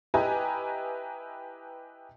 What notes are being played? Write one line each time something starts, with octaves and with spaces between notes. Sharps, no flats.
E4 G4 B4 D#5 G#5 A#5